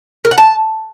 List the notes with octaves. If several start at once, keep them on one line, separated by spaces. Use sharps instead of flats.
A#4
F#5
A5